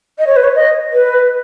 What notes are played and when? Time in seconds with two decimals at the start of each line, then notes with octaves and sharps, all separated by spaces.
0.18 D#5
0.27 C#5
0.36 B4
0.44 C#5
0.55 D#5
0.93 B4